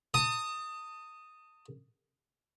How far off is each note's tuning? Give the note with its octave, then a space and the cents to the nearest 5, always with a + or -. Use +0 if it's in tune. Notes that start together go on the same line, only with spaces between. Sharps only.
A5 +35 D#6 +0